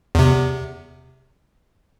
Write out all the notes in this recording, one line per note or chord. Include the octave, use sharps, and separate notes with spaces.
E2 C3